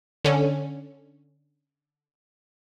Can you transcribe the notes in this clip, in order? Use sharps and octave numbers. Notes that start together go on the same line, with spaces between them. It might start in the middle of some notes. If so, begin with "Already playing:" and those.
D3 C#4